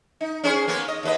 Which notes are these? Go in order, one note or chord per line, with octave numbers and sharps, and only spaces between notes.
D#4
C#4 G#4 C5
A#3 B3 C#4
D#5
D#2 B4 D#5